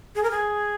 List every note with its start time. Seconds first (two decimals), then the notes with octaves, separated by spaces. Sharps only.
0.15 G#4
0.23 A#4
0.31 G#4